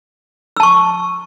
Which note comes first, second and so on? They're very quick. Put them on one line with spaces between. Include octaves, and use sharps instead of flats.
E6 A5 C#6